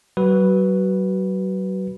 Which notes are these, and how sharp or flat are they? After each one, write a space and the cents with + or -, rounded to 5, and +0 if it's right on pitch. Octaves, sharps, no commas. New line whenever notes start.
F#3 +35 F#4 +20 B4 -5